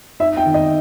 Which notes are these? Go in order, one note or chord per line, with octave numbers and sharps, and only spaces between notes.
D#4 E5
G5
D#3
D#5